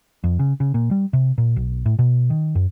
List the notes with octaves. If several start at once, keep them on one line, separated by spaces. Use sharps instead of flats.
F2
C#3
C#3
A#2
G3
C3
A#2
B1
A2
B2
D#3
F#2